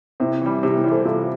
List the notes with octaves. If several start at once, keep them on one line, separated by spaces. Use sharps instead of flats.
C3 C4 E4
E3 G3
C3 E4 G4
C4 E4
E3 G3
A4 C5
C3 F4 A4